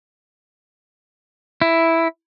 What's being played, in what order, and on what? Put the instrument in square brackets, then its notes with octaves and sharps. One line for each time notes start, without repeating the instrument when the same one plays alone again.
[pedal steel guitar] E4